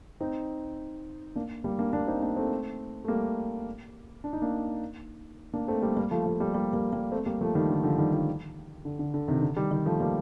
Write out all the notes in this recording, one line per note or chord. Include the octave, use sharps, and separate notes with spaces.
C4 D#4
A#3 D4
G3 A#3
A#3 D4
A#3 D4
C4 D#4
A#3 D4
A3 C4
A3
G3 A#3
D4
D#4
A#3 D4
A#3 D4
A3 C4
G3 A#3
G3 A#3
F3 A3
F3 A3
G3 A#3
G3 A#3
G3 A#3
G3 A#3
A3 C4
G3 A#3
F3 A3
D#3 G3
D3
D3 F3
D#3 G3
D3 F3
D3
D3
D3
C3 D#3
D3
D#3 G3
D#3 G3
F3 A3
G3 A#3